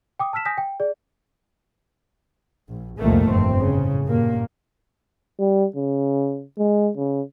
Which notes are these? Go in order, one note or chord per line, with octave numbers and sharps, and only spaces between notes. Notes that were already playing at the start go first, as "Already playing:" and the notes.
G5 D6 D#6
A5 E6 F6 B6 E7
G#5 D#6 G6 A#6 B6
G5
G#4 D5
A#1
C2 F2 A#2 D#3 A3 A#3
G1 F2 C4
A2 C#3
G2 A#2 A#3
G3
C#3
G#3
C#3